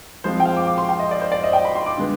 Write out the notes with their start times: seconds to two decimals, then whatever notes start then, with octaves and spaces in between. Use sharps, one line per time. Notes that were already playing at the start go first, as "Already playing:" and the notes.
0.24 F3 G#3 C4 C5
0.40 G5
0.45 F5
0.57 D6
0.67 D6
0.78 C6
0.89 G5
0.99 D#5
1.11 D5
1.21 C5
1.32 D5
1.43 D#5
1.53 G5
1.65 B5
1.75 C6
1.86 D6
1.97 D3 G#3 B3